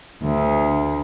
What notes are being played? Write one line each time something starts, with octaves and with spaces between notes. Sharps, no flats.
D2